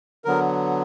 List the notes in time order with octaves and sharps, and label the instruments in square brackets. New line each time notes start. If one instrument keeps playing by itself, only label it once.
[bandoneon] D3 F#3 B3 A#4